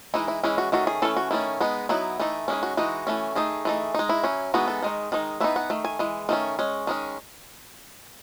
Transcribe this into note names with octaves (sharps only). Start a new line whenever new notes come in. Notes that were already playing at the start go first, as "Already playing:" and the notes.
E3 G#3 D#4 E4
E4
E3 G#3 C#4 E4
F#4
D#3 A3 C#4 F#4
G#4
E3 A3 C#4 A4
F#4
D#3 A3 C#4 E4
G#3 B3 D#4
F#3 B3 D#4 E4
E3 A3 D#4
D#3 G#3 C#4 E4
F#4
E3 G#3 D#4 F#4
E3 A3 C#4
D#3 A3 D#4 G#4
E3 A3 D#4
G#3 D#4
E4
F#3 C#4
E3 G#3 B3 D#4 F#4
A4
D#3 G#3 D#4
D#3 G#3 D#4
E3 B3 D#4 E5
F#5
D#3 A3
G#5
E3 G#3
D#3 A3 C#4
G#3 C#4
D#3 G#3 C#4